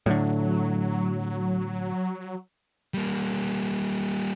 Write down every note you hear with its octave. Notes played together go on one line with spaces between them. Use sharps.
A2 D3 F#3
G3 A#3